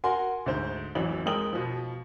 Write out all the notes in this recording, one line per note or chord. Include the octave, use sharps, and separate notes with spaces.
F#4 A#4 F#5 G#5 C6
D2 G#2 C5
A1 F2 E3 F#3 F#7
F2 G#3 A#4 G5 D#6 F#7
B2 F3